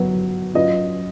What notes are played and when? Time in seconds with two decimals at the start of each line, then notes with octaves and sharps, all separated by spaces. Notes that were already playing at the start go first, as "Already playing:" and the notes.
Already playing: F#3 B3 F#4 B4
0.54 F#3 C#4 F4 B4 D#5